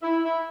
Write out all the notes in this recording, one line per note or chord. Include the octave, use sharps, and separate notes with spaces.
E4
E4